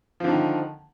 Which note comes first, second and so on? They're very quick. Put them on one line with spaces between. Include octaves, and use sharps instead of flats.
F3 D3 D#3